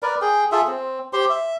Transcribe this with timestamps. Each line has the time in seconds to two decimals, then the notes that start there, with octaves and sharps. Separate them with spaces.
0.03 A#4 B4 D5
0.22 G#4 G5
0.52 F4 G#4 A4 E5
0.67 C4
1.13 G4 C5 C6
1.30 E5